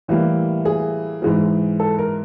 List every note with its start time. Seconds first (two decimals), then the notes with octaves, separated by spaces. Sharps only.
0.08 A2 E3 G3 A#3
0.65 G#4
1.22 G#2 E3 G#3
1.80 A4
1.99 A#4